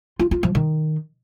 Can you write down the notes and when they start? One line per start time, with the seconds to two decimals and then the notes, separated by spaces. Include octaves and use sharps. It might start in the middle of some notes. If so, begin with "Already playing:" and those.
0.19 F4
0.31 F4
0.43 F3
0.55 D#3